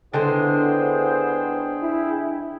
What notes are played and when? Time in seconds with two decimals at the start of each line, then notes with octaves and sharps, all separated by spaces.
0.14 D3 G#3 B3 C4 E4 G#4 C5 G5
1.81 E4